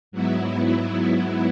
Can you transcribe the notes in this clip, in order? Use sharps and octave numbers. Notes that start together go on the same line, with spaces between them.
G#2 F#3 B3 E4